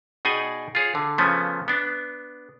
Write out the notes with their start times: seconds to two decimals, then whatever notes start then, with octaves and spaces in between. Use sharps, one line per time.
0.25 B2 D#4 G#4 D5 G5 G#5
0.75 F4 G#4 C#5
0.95 D3
1.18 C#3 F3 A3 B3 C#4
1.68 B3 D4